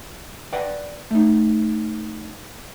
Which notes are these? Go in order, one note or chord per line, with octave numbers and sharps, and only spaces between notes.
B4 D5 F#5 G5
A3 D#4